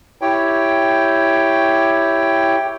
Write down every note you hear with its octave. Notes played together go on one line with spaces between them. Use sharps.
E4 G4 C#5 G5